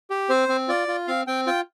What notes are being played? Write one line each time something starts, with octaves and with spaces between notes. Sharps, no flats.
G4
C4 C5
C4
F4 D5
F4
C4 F5
C4 G5
F4 G5